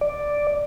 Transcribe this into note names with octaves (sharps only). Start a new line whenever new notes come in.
D5